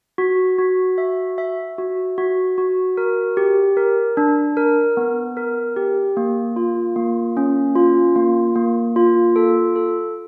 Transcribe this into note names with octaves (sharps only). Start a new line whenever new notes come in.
F#4
F#4
E5
E5
F#4
F#4
F#4
A#4
G4
A#4
D4
A#4
B3
A#4
G4
A#3
F4
A#3
C#4
F4
A#3
A#3
F4
A4
A4